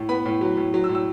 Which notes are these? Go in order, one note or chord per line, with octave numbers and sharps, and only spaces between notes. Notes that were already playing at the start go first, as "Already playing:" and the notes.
Already playing: A2
B3 B5
A2
F#3
A2
F#3
E6
A2
E6